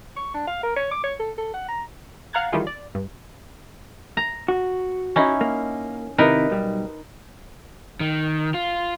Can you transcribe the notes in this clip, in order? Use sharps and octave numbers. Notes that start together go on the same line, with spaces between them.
C#6
D4
F5
A#4
C#5
D6
C#5
A4
A4
F#5
A#5
F5 F#5 A#5 F#6 G#6 A6
D#3 E3 G3 D#4 F4 G#4
D5
G2
A#5
F#4
C#4 D#4 E4
A#3
C3 D#3 D#4 E4 A#4 B4
B1 G3
D#3
F4